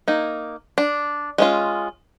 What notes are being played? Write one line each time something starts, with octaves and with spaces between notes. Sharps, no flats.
A#3 D#4
D4
G#3 C#4 F4